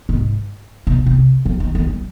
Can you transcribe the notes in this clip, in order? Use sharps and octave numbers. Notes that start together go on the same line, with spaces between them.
G#2
B2
C3
F3
D#3
D#3
G3